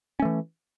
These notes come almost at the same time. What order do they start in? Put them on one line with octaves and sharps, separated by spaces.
C#4 A3 E3